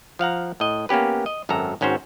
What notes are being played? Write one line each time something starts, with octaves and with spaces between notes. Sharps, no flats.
F3 F5 F#5 A#5
A2 D#5
A#3 B3 C#4 G4 B4
D#5
G#1 F#2 F#3 A4 A#5
G#1 G#2 C#4 F#4 C5